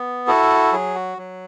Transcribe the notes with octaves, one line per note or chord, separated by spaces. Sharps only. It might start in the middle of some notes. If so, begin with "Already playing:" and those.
Already playing: B3
E4 F#4 A4
F#3 G#4
F#4
F#3